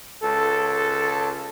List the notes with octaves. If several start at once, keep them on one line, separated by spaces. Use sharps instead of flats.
C#2 A4